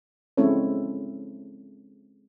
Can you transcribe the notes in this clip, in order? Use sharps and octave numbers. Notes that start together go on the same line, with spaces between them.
G#3 C4 C#4 E4 A4 C#5